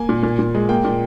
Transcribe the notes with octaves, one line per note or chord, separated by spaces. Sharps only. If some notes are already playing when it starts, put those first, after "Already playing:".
Already playing: A#3 G#5
A#2
A#2
A#2
G#3
A#3 G5
A#2